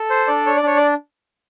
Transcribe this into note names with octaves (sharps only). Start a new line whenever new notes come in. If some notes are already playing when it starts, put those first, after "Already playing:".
Already playing: A4
C5
D4 D5
C#5
D5
D4 C#5
D5